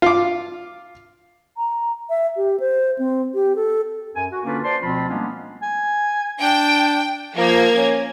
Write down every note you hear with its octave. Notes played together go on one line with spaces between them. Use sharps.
F4 D6
A#5
E5
G4
C5
C4
G4
A4
F#2 G#5
F#4
D3 A#3 C#4 D4 F4 B4
C5 D5 A5 C6
D2 B2 F3 C4 F4 B5
G3 G#3 A#3 B3 C#4 D4
G#5
D4 G5
F3 A#3 G#6
C#4